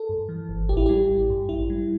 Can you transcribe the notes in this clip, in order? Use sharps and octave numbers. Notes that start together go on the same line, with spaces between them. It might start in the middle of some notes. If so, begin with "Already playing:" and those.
Already playing: A4
G2
E3
G1
A1 G4
E4
G3 G4
A1
G2
A1 E4
G3